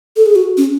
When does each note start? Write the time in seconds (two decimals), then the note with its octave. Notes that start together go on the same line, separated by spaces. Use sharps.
0.16 A4
0.26 G#4
0.35 F#4
0.57 C#4